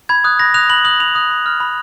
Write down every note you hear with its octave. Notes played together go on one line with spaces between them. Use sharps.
B5 G#6
D#6 F#6
B5 A#6
D#6 F#6 F7
B5 F#7
D#6 F#6 F#7
B5 F7
D#6 F#6
B5
F6
B5